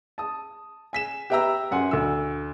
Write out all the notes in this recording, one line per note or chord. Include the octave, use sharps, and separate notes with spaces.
A5 D#6
G#5 B6 E7
G4 B4 E5 G5 A#5 E6
F#2 F#5 G#5 C6
D2 E6